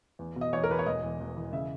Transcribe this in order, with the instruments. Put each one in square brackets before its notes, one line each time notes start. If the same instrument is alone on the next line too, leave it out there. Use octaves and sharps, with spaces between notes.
[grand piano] E2
B2
D#5
E2 C#5
A#4
E2 B4
C#5
E1 D#5
E2
E2
E3
C#3 E5